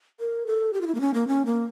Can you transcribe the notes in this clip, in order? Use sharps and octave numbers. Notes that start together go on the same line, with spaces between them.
A#4
A4
G4
F4
E4
A#3
C#4
A#3
C#4
A#3